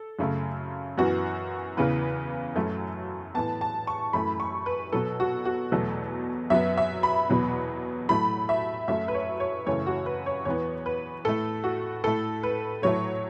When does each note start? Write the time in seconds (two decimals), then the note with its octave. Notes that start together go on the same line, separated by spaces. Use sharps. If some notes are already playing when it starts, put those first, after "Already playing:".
Already playing: A4
0.19 F#2 C#3 A3
0.98 F#2 E3 B3 F#4
1.77 E2 C#3 E3 B3 B4
2.56 F#2 F#3 A3
3.34 A2 E3 B3 A5
3.61 A5
3.87 C#6
4.13 F#2 E3 A3 B5
4.40 C#6
4.66 B4
4.92 B2 F#3 B3 A4
5.20 F#4
5.45 F#4
5.72 E2 B2 F#3 A3 A4
6.50 F#2 F#3 B3 E5
6.77 E5
7.03 B5
7.30 E2 B2 F#3 B3
8.09 A2 F#3 A3 B5
8.49 E5
8.88 F#2 F#3 A3 E5
9.08 B4
9.14 C#5
9.40 C#5
9.67 F#2 C#3 E3 A3 C#5
9.86 F#4
10.06 B4
10.26 C#5
10.45 E2 E3 B3 C#5
10.86 B4
11.25 A2 A3 A4
11.64 F#4
12.04 A2 A3 A4
12.43 B4
12.82 A2 F#3 A3 C#5